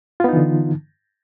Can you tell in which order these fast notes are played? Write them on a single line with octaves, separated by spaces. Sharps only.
F4 B3 D#4 E3 D3